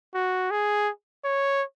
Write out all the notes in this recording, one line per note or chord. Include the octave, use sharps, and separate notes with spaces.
F#4
G#4
C#5